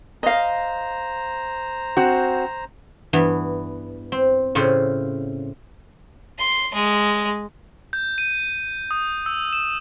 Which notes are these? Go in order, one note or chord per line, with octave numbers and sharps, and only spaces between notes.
C5 D#5 F5 A#5
C4 F#4
G2 E3 B3
C4
A2 C#3 C4 F4
C6
G#3
G6
D#7
D#6
E6
E7